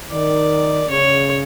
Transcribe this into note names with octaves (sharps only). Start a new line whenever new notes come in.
D#3 D5
C#3 C#5